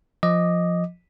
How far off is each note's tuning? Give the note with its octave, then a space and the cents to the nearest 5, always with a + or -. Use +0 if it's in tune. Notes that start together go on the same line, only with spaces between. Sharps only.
F3 +0 D#5 +0 D6 +5